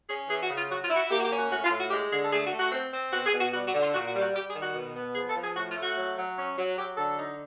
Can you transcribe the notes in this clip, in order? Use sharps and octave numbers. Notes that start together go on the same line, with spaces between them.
C#4 G#4
E3 G#4
F#4
C#3
F4
F#3 F#4
F4
E4
F#4
A#3 G4
F#4
G4
C#4
F#4
A2 F#4
F4
A2
F#4
G#3 G4
D3 G#4
A4
A3 G#4
F#4
A3
F#4
C4
C4
B2 F#4
G#4
B2
F#4
G3 F#4
F#4
D3
F4
A#2 F#4
F#4
G3
F#4
G3 G4
G#4
D#3
F#4
B2
B3
F3 G#4
A4
F3
G#4
A2 F#4
F4
A3
F#4
F#3
F#3
C#4
F#3
F#3 G4
D3 A4
D#4